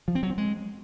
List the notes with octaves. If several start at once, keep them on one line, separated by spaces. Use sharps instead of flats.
F3
C4
F#3
C4
G#3